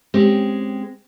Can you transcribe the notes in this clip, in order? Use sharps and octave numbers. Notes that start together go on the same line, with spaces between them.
G#3 C4 C#4 G4